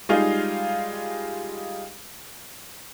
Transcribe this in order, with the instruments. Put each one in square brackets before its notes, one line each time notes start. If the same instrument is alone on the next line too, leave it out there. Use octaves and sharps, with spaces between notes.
[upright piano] G3 G#3 D#4 F4 G#4 F5